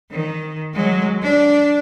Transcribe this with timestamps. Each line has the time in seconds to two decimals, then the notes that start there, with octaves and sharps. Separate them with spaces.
0.11 D#3
0.73 F#3 G#3
1.22 D4